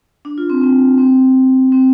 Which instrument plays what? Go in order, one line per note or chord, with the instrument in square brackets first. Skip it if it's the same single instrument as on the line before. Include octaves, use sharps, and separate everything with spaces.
[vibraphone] D4
F4
C4
C4
C4
C4